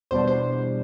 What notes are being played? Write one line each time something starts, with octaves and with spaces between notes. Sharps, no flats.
E2 B2 G3 D4 C5
C5